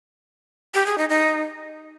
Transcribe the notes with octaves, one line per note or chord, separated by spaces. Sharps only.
G4
G#4
D#4
D#4